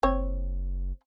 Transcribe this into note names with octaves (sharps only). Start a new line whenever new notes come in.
F#1 C4 C#5